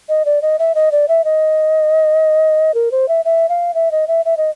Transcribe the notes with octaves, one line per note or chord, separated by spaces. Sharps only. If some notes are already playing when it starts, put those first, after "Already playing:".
D#5
D5
D#5
E5
D#5
D5
E5
D#5
A#4
C5
E5
E5
F5
E5
D#5
E5
E5
D#5